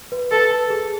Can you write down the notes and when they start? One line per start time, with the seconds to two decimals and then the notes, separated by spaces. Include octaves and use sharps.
0.12 B4
0.31 A4 B4
0.51 A5
0.70 G#4